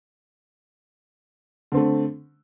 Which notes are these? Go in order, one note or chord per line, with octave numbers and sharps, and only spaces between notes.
D3 A3 C4